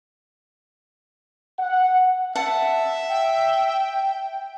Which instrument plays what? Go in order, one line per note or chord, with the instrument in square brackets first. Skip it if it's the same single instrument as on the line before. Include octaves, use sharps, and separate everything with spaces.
[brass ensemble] F#5
[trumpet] E5 [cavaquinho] F#5 A5
[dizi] G5